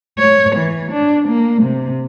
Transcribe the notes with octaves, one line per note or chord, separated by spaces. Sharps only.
C#5
E3
D4
A#3
C3